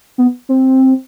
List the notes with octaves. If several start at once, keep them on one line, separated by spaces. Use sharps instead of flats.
B3
C4